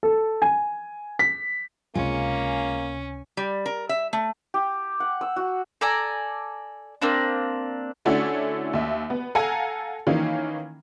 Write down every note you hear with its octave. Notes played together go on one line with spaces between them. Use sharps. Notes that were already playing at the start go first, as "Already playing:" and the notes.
A4
G#5
B6
C#2 C3 G#3 A#3 C#4 F4 G#5
G3
A#4
E5
A3
G4
F#5
E6
F#4
A4 D5 G#5 A#5
A#3 C4 D4
D3 A3 C#4 D4 E4 F#4
D#2 E5
B3
A4 F5 F#5 G#5 A#5
D#3 E3 A#3 C#4 F5